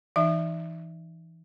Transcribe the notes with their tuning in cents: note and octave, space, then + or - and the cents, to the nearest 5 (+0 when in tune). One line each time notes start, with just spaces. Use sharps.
E3 +0 D#4 -25 E5 +10